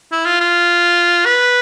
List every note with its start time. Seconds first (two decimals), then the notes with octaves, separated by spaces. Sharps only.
0.12 E4
0.25 F4
0.40 F4
1.25 B4